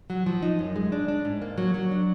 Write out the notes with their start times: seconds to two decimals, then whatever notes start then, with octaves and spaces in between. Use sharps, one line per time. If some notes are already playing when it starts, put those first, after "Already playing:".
0.10 F#3
0.26 F3
0.42 D#4
0.59 F#2
0.76 G#3
0.92 D4
1.08 D4
1.25 G#2
1.42 A#3
1.58 F#3
1.74 F#3
1.91 D4